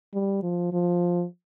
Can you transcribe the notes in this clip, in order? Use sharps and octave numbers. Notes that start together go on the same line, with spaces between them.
G3
F3
F3